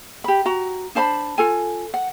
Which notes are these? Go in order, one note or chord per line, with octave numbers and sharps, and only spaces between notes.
G4 B5
F#4 A#5
D4 C5 A5 B5
F4 A4 G#5
F#5